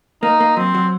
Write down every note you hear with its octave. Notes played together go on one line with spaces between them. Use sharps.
A#3 D#4
A#3
F#3 C4
F#3